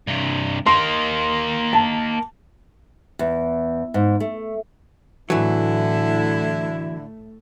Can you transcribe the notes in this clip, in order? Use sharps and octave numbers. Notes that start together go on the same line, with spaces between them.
G2 C3
A#3 D#4 C6
A5
E2
G#2
A3
A2 D3 E3 F#3 A3 E4